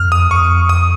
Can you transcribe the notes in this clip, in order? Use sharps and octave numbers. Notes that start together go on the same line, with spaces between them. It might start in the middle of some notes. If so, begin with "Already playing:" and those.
Already playing: F2 F6
D#6
F2 C#6
D#6